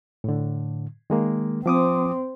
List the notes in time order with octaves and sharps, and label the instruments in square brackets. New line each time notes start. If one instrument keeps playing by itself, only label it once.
[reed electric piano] A2 D3
D#3 G#3 A#3
[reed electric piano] F3 D6 D#6 [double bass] C4